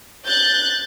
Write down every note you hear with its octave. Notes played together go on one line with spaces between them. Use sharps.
F#6 G6 A6